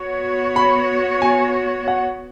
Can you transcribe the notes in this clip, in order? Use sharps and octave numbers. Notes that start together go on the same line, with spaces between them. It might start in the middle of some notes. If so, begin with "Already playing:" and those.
Already playing: B3 F#4 C#5
B5
G#5
F#5